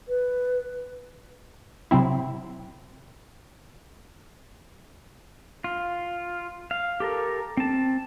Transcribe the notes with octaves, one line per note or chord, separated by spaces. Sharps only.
B4
C3 F#3 C4 E4
F4
F5
G4 A4 A#4
C4 A5